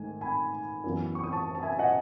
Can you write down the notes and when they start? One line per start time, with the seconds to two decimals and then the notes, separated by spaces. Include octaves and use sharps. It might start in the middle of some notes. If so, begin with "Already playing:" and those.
Already playing: G#2 D#3 A3 G#5
0.21 G#5 B5
0.84 F#2 E3 B3
1.15 C#6
1.24 D#6
1.32 A5 C#6
1.55 A5
1.63 E5 G#5
1.79 D#5 F#5